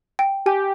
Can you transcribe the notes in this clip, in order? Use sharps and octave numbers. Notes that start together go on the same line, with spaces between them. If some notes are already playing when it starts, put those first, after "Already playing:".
G5
G4 G#5